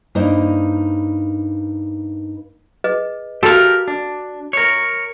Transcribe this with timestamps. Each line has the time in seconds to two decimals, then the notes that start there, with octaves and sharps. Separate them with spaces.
0.15 G2 A#3 D#4 E4 C5 D#5
2.84 G#4 B4 D#5
3.43 F#4 G4 A4 A#4 F5
3.88 D4
4.53 A#4 C#5